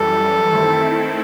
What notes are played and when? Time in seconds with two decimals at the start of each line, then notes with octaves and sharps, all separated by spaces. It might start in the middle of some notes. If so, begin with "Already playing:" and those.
Already playing: F#2 E3 G3 A4
0.51 D#3 A3 C4 E4